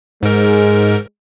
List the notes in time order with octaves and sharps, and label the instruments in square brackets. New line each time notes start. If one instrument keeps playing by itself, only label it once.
[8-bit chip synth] G#2 A#4 [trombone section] G#3